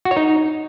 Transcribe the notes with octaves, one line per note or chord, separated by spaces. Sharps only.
F#4
C#5
D#4